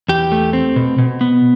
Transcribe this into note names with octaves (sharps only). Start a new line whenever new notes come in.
E2 G4
A3
C4
B2
B2
B3